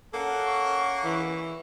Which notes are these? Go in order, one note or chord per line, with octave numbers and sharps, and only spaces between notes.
A#3 C#4 A4 F#5
C#6
E3 C#6